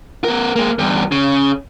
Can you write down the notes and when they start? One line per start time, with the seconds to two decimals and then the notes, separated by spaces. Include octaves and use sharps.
0.24 B3 A#4
0.56 G#3 A#3
0.79 E2 G2
1.12 C#3